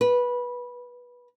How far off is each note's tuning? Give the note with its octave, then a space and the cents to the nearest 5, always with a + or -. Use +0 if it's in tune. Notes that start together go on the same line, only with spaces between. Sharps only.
B4 -15